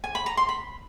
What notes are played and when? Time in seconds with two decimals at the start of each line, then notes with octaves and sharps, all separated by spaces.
0.04 G#5
0.15 B5
0.26 A#5
0.37 C6
0.49 B5